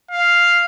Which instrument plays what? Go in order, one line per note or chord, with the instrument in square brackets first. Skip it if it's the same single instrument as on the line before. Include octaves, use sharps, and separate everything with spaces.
[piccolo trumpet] F5